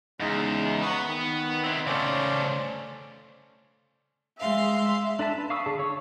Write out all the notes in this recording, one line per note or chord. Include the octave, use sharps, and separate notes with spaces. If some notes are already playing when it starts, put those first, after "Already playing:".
E2 C#3 G#3 D#4
B4 F#5 C#6 D#6
D#3 B3
C4 E4
C#3 A3 C#4 C5 D5
G#3 E5 F5 C6
D4 A4 E5 A5
B4
F5 C#6 D#6 E6
D3 G#4 A5
C#5 C#6